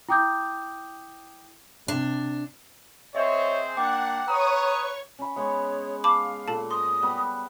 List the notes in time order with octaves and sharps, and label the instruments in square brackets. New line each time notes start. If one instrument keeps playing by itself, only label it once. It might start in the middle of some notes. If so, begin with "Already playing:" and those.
[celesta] E4 G5 D6 D#6 G6
[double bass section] C3 [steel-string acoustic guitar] D4
[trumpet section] C4 G#4 C5 [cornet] C#5 [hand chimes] D#5 E5
[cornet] A#3 [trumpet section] D4 [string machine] F#5 [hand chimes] G5 D6
[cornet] B4 [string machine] C#5 C#6 [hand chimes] A#5 [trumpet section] D#6
[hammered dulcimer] C#4 B5
[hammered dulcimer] G#3 B3 C#6 [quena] C#5
[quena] F5 [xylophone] A5 B5 D6
[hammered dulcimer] A#2 [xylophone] A4 A5
[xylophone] C6 [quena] D#6
[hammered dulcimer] G3 B3 B5